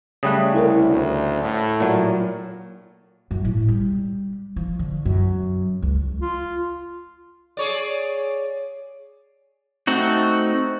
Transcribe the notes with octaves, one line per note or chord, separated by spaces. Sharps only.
C#3 G3 A3 D#6 F#6
C2 E4 A4 A#4
D2
A2
A#2 F#3
F#2
A2
G3
F3
D3
F#2
C#2
F4
G#4 C#5 D5
A3 C4 D#4 F#4